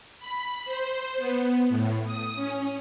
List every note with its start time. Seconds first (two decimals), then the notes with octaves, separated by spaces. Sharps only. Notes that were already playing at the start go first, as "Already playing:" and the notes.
0.18 B5
0.65 C5
1.18 B3
1.69 A2
2.06 D#6
2.36 C#4